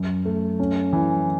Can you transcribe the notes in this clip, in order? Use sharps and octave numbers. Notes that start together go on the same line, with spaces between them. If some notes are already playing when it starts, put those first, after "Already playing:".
Already playing: F#2
A3
C#4
E3